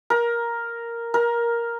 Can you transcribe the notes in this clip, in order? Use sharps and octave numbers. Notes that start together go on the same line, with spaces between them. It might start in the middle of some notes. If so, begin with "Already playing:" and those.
A#4
A#4